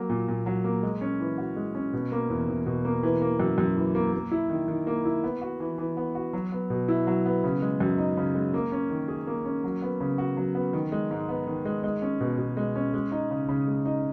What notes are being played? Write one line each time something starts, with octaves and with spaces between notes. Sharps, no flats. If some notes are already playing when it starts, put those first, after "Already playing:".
Already playing: F#3 A#3
A#2
A#2
F#3
A#3
G#3
C#4
E3
F#4
G#3
C#4
B2
A#3
E2
E2
B2
A#3
E3
A#3
F#2
F#2
E3
A#3
A#3
E4
D#3
D#3
A#3
E4
B3
F#4
E3
E3
B3
F#4
F#3
B3
B2
E4
F#3
B3
C#3
G#3
F#2
D#4
C#3
G#3
A#3
C#4
D#3
G#4
A#3
C#4
F#3
B3
C#3
F#4
F#3
B3
D#3
G#3
G#2
B3
D#3
G#3
G#3
C#4
B2
B2
G#3
C#4
G#3
D#4
C#3
C#3
G#3
D#4